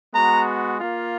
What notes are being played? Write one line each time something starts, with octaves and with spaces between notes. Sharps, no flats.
G#3 B3 F#4 A#5
A#3 F4